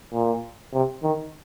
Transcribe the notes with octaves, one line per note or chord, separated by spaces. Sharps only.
A#2
C3
D#3